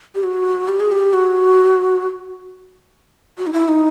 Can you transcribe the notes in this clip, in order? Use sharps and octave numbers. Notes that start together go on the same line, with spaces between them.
G4
F#4
G4
G#4
G4
F#4
F#4
D#4
E4
D#4